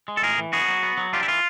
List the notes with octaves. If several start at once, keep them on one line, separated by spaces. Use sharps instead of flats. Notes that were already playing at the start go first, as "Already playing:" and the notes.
G#3
A4
A2 G#4 A#4
E3
B3 F#4 G#4
F#3
B3
F#3
D4 F4 G4
E4
E3 F4